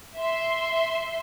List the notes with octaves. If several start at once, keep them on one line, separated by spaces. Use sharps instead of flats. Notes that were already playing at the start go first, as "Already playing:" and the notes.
E5 C6